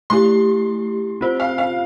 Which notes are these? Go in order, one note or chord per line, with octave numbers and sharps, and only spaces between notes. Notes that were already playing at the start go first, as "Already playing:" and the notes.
A3 E4 G4 C6
C4 F4 C5
F5
F5